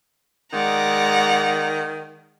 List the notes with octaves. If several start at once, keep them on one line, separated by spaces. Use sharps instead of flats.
D#3 G#3 D5 F#5 A#5